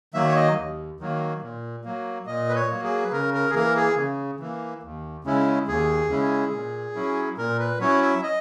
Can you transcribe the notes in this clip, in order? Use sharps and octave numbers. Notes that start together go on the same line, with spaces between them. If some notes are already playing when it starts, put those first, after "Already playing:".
D#3 F#3 A#3 E5
C#5
D#5
D#2
D#3 F#3 A#3
A#2
F#3 A#3
A#2 D#5
B4
C#5
F#3 A#3
G#4
B4
C#3 A#4
A#4
G#4
E3 A#3 A#4
G#4
C#3
E3 A#3
D#2
C#3 G#3 C#4 E4
D#2 G#4
C#3 G#3 C#4 E4
A#2
F#3 C#4 E4
A#2 A#4
B4
F#3 C#4 E4 C#5
E5
D#5